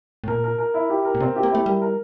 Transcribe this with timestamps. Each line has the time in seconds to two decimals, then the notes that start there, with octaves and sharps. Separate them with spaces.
0.24 A2
0.28 A#2 A#4
0.44 A#4
0.58 A#4
0.74 E4
0.90 G4
1.05 A#4
1.15 A#2
1.20 C3 C4
1.36 G4
1.43 A#3
1.51 A3 E4
1.66 G3 A#4
1.82 A#4